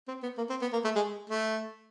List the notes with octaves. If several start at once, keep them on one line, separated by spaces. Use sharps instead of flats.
C4
B3
A#3
C4
B3
A#3
A3
G#3
A3